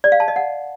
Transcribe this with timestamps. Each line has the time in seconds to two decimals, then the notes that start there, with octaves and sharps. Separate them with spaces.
0.04 D5
0.12 F5
0.20 A5
0.28 D#5
0.36 F#5